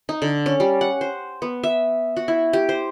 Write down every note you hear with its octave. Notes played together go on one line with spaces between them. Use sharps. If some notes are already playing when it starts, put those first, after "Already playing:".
D#4
D3
C#4
G3
F#5
C5
B3
E5
F#4
E4
G4
C5